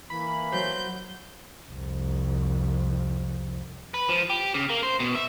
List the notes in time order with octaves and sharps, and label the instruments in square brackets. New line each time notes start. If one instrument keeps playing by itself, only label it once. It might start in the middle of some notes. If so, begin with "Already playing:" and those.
[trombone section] E3 A#3 [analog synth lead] B5
[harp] F#3 C5 [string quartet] G6
[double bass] C2 F2
[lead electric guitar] B4
F3
G4
C#3
A#3
C5
B2
E5